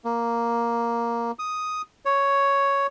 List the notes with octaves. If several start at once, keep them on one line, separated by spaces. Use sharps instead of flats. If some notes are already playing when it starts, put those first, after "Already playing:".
A#3
D#6
C#5